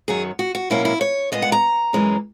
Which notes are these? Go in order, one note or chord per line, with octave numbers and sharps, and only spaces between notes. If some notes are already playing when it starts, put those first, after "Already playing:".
F#2 D#3 F#3 G#4
F#4
F#4
B2 F#3 A#3 C#4 E4
E4
C#5
A#2 G#3 B3 D#5
F#5
A#5
F#2 E3 G#3 C#4